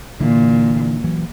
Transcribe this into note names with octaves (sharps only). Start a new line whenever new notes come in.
A#2 D3 E3
E3 F#3